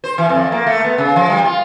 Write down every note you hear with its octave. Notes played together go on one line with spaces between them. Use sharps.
C5
E3
F2
A#3
A3
B3
C#3
F3
G3
F4